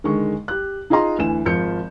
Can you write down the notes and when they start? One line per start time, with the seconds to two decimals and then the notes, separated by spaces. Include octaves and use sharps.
0.04 D3 D#3 G#3 C#6
0.48 G4 F#6
0.90 D#4 F4 G#4 D#5 A#5 C6
1.18 D2 E3 G#5 E7
1.46 G#1 F3 G6 C#7